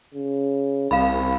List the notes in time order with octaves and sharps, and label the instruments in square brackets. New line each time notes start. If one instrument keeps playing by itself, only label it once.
[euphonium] C#3
[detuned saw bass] C2 [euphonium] C4 [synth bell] F5 B5